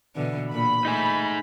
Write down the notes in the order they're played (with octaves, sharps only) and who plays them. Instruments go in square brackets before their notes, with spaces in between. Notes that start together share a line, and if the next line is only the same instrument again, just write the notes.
[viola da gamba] B2 D3 E3
[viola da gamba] A#2 D3 [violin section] B5
[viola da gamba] A3 [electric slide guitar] D#4 G#4 G#5